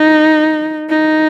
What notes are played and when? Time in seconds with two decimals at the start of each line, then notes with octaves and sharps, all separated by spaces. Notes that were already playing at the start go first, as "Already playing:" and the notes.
Already playing: D#4
0.89 D#4